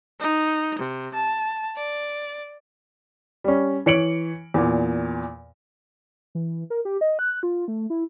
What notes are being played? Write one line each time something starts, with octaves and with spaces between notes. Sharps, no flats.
D#4
C3
A5
D5
G3 C#4
E3 C#5 C#7 D7 F#7
E2 A#2
E3
A#4
G4
D#5
F#6
F4
A3
E4